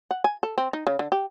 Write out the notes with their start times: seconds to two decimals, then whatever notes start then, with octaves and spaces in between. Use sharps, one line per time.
0.11 F#5
0.24 G#5
0.43 A4
0.58 C4
0.73 D#4
0.87 C#3
0.99 D3
1.12 G4